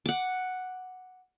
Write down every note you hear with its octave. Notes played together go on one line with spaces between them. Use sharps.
F#5 D6